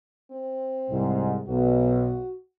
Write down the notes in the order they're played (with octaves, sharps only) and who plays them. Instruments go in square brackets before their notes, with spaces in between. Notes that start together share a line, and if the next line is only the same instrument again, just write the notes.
[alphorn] C4
[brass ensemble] C2 G#2
[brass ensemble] B1 [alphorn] F#4